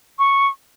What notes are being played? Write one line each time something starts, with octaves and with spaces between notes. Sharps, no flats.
C#6